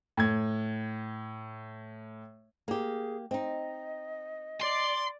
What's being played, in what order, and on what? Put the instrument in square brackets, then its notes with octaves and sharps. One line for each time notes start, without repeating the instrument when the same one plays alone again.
[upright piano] A2 G#6
[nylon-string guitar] A#3 G4 [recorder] G#4
[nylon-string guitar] C4 D#4 [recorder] D#5
[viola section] D5 [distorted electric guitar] C6